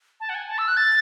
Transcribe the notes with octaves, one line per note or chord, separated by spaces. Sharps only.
A5
F#5
G#5
A5
E6
F#6
A6